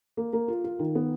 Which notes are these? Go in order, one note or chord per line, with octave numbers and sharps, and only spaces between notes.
A#3
A#3
F4
F4
D#3
B3